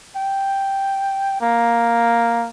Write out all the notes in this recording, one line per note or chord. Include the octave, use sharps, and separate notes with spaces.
G5
A#3